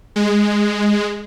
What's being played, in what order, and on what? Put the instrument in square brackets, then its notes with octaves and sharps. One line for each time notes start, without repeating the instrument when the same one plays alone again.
[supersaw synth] G#3